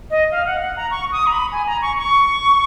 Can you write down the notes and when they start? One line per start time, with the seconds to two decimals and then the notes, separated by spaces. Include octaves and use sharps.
0.10 D#5
0.31 F5
0.46 F#5
0.61 F#5
0.77 A#5
0.91 C#6
1.12 D#6
1.27 A#5
1.32 B5
1.52 G#5
1.67 A#5
1.82 C#6
1.98 C#6